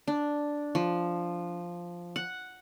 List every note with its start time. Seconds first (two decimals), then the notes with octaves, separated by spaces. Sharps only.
0.08 D4
0.75 F3
2.16 F#5